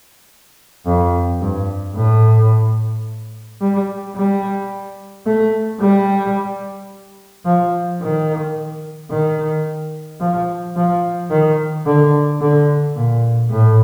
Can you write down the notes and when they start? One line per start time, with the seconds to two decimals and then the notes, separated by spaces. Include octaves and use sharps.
0.86 F2
1.41 G2
1.96 A2
3.61 G3
4.15 G3
5.26 A3
5.80 G3
7.45 F3
8.01 D#3
9.11 D#3
10.20 F3
10.76 F3
11.30 D#3
11.86 D3
12.41 D3
12.96 A#2
13.50 A2